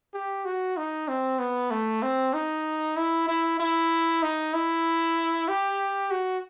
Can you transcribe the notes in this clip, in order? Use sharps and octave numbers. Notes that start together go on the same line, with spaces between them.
G4
F#4
D#4
C4
B3
A3
C4
D#4
E4
E4
E4
D#4
E4
G4
F#4